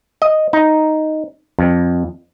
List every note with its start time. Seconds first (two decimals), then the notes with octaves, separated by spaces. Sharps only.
0.22 D#5
0.53 D#4
1.59 F2